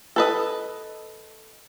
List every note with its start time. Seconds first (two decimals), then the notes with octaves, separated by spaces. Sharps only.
0.16 A4 B4 D#5